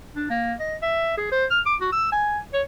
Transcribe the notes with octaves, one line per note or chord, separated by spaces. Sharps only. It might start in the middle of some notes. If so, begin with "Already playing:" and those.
D4
A#3
D#5
E5
G#4
C5
F6
D6
F#4
E6
G#5
C#5